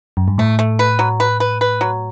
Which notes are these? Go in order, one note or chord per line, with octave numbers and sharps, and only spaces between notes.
F#2
G2
A2 A3
A3
B4
F#3
B4
B4
B4
F#3